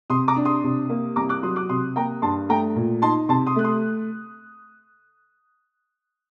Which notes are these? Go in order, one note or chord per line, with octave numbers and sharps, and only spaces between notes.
C3 C6 D#6
A#5 D6
D4
C6 D#6
C3
A#3
C2 A#5 D6
D6 F#6
F#3 C6 D#6
D6 F#6
C3 C6 D#6
A#3 G5 A#5
G2 A5 C6
A3 G5 A#5
A#2
D#4 A5 C6
C3 A5 C6
C6 D#6
A3 F#6
C6 D#6